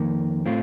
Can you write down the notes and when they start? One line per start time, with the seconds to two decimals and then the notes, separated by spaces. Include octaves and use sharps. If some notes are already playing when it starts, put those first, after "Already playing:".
Already playing: F2 D#3 A#3
0.46 A2 A3 C4 F4